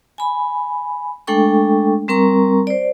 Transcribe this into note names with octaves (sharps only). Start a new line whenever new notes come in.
G#5 B5
G#3 A3 D4 A4 G5 C#6
G3 C4 A#4 A#5 C#6
C5 D5